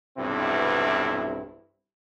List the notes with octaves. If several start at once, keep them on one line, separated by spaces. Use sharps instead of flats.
B1 E2 G2 C3 C4 E4